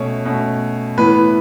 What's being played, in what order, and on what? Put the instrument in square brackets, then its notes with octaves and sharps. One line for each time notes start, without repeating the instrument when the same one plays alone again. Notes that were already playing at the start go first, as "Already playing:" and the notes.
Already playing: [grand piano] B2 A3 C#4 C#5
B2 A3 C#4
A2 E3 B3 B4